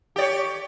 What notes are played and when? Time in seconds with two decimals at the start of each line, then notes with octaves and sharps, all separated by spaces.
0.16 G4
0.18 D5
0.21 C#5